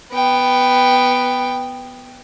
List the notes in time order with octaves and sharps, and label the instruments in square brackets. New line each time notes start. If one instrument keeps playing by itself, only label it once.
[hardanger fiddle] B3 G5